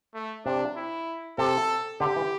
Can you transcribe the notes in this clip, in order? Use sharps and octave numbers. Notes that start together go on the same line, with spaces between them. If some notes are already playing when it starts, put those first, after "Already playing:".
A3
C3 D4
E4
C3 A4
D3 G4
E3